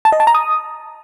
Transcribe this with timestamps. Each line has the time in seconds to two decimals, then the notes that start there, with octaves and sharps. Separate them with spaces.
0.05 A5
0.12 D#5
0.20 A5
0.27 A#5
0.35 D#6